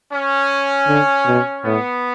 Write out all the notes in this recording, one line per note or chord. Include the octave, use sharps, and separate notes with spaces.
C#4
D3
B2
A2 B3